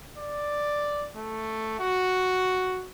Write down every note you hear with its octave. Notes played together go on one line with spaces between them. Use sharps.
D5
A3
F#4